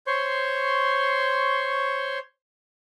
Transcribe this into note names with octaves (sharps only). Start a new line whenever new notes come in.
C5 C#5 C6 C#6